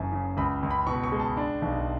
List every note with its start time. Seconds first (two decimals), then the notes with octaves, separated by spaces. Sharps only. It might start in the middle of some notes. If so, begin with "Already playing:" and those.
Already playing: F#1 F#2
0.12 C#3
0.37 C#2 B5
0.63 C#2
0.71 B5
0.87 B2 C#6
1.03 C#6
1.12 G#3
1.20 A5
1.37 D4
1.62 B1